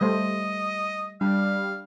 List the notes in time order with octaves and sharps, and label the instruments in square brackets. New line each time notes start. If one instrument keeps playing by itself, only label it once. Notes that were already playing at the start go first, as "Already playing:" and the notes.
[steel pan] G3 A3 C5 [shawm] D#5
[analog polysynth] G3 [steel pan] D4 [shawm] F5